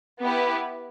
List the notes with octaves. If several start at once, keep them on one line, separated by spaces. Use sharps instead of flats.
B3 E4 G4 B4